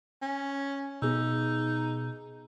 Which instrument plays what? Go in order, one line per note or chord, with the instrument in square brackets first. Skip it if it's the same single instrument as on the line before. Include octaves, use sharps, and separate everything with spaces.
[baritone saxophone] C#4
[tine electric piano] B2 [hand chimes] B3 G#4 E6 [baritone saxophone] D#4